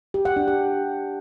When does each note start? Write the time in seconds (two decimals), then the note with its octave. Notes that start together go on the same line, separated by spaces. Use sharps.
0.14 G4
0.25 F#5
0.36 D4
0.48 G4